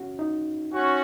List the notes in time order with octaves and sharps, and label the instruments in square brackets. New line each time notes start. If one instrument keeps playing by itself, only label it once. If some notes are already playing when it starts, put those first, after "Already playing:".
Already playing: [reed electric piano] C#4 F#4
D#4
[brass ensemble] C#4 F#4